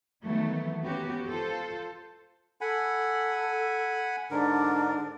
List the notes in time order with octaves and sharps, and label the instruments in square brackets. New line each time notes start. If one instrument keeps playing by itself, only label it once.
[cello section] D#3 E3 F#3 A3 B3
A#3 B3 C#4 F#4 G4
F4 A4 C5
[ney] A4 [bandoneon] F#5 G#5 B5
[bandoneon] G#2 D3 A#4 [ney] D4